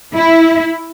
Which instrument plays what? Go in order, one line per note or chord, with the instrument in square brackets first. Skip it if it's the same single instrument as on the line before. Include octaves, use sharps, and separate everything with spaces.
[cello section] E4